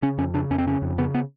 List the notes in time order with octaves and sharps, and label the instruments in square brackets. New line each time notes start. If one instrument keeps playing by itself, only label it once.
[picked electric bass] C#3 C#4
F2 C#4
C#3 D4
F2 C#4
C4
C#3 C#4
F2
C#3 B3
B3